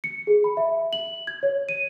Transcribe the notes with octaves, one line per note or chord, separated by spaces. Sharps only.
C#7
G#4
B5
E5
F#7
G#6
C#5
D#7